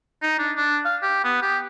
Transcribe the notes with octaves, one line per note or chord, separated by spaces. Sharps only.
D#4
D4
D4
F5
G4
B3
G4